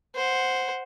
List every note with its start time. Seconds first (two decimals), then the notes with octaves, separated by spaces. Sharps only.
0.15 C5 F#5